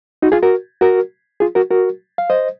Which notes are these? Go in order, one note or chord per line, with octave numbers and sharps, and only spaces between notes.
D#4 F#4
F4 G#4
F#4 A#4
F#4 A#4
F4 G#4
F#4 A#4
F#4 A#4
F5
C5 D#5